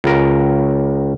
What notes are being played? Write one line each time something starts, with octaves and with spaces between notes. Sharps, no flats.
C#2 A#4